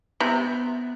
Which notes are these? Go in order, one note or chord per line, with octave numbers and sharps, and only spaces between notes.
C3 B3